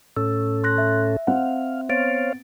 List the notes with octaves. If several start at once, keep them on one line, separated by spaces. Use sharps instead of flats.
A2 C#4 A4 E6
C6 F#6 A#6
E5
C4 F5 F#5
B3 C5 C#5 F5 A6 D7